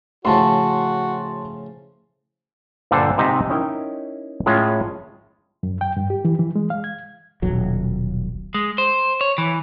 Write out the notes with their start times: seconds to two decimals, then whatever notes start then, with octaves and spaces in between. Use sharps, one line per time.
0.25 A2 C#3 F3 F#4 A5 C6
2.91 G2 A#2 D3 A4 C5
3.18 G#2 C3 D#4 D#5 E5
3.50 C#4 D#4 E4 A#4 C#5 G5
4.46 A2 G#3 C#4 F4
5.63 F#2
5.81 G5
5.97 G2
6.10 G4
6.25 E3
6.39 E3
6.55 G#3
6.70 F5
6.84 G#6
7.42 D#1 B1 F#3
8.54 G#3
8.78 C5
9.21 C#5
9.38 E3